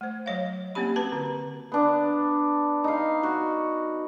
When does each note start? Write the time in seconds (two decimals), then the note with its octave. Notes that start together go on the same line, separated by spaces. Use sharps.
0.01 A3 C5
0.26 F#3 C#5 F5
0.75 A#3 C4 C#4 G4 B5
0.96 F#4 B4 A5
1.12 D3
1.72 B3 D4
2.84 D#4 F5
3.23 F#4